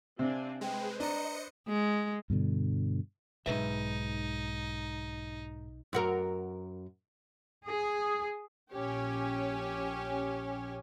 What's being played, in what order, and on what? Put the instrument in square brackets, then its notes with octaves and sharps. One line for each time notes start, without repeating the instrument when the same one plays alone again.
[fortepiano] C3 [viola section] C4 D4 G#5 [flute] F5
[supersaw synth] G#3 [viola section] B4 C5 [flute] G5
[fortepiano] D4 [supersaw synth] D#5 C#7 [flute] A#5
[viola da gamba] G#3
[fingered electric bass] G2 B2 D3
[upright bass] B1 [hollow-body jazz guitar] G#2 B4 E5 [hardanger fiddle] D#4
[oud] F#2 F#4 A#4
[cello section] G#4
[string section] A#1 C#4 G4 C#5 G#5